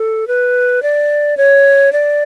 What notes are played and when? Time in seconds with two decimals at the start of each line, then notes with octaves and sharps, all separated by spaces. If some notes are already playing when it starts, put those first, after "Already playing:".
Already playing: A4
0.28 B4
0.83 D5
1.37 C#5
1.92 D5